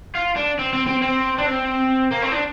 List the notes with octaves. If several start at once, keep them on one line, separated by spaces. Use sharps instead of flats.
F4
D4
C4
C4
C4
C4
D4
C4
A#3
C4
D4